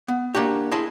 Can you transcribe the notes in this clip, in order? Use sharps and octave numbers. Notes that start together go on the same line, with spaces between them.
B3
A#3 D4 F#4 G4
E4 G#4 D#5 A5 C6